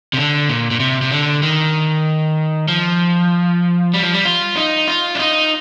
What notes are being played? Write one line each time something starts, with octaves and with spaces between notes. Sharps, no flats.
C3
D3
A#2
A#2
C3
C3
D3
D#3
F3
G3
F3
G3
F4
D#4
F4
D4
D#4